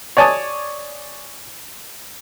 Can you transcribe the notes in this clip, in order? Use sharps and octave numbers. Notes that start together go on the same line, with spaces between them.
C#5 D5 G#5 A5 D#6